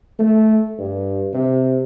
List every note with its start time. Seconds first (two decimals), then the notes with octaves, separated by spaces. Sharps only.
0.19 A3
0.79 G2
1.34 C3